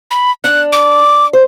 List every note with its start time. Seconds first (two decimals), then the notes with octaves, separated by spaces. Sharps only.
0.11 B5
0.44 D4 F#6
0.72 D6
1.33 C5